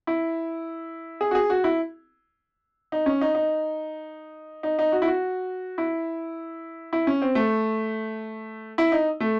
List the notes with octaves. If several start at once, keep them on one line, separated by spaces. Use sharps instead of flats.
E4
G#4
F#4
G#4
F#4
E4
D#4
C#4
D#4
D#4
D#4
D#4
F#4
E4
F#4
E4
E4
C#4
C4
A3
E4
D#4
A3